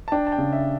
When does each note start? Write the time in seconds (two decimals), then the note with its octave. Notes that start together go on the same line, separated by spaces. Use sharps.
0.08 A5
0.12 D4 G5
0.27 A5
0.32 G5
0.38 C#3
0.52 E5